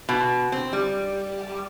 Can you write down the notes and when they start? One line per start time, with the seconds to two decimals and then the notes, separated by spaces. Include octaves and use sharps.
0.09 B2
0.52 C4
0.73 G3